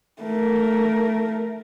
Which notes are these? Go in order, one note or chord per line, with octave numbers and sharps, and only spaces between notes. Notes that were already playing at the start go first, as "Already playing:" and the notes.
A3 A#4